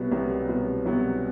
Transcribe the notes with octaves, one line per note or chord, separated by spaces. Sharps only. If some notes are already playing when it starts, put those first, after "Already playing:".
Already playing: C2 B2 F#3 B3
C2 B2 F#3 B3
C2 B2 F#3 B3
C2 B2 F#3 B3